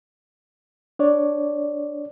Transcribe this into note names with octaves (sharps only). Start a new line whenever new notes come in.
D4 C#5 D5